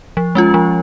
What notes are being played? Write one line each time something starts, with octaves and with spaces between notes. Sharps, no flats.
F3
G#3 C#4 F4
F3